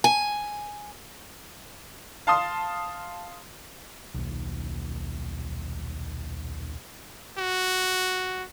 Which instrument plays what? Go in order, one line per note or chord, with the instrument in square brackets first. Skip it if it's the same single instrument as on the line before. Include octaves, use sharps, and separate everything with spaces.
[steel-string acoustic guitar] G#5
[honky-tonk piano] F5 A5 C6 D#6
[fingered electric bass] D#1 B1
[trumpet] F#4